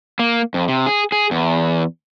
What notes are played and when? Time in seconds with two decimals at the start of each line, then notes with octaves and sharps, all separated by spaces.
0.19 A#3
0.54 F2
0.68 C3
0.86 G#4
1.12 G#4
1.31 E2